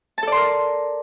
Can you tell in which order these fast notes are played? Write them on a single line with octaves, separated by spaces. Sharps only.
A5 A4 D5 C6 A#4